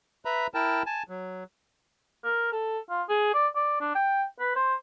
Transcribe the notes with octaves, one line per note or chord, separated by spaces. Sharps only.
B4 E5 A#5 B5
E4 A#4 G5 A5
G#5 A5
F#3
A#4
A4
F4
G#4
D5
D5
D4
G5
B4
C5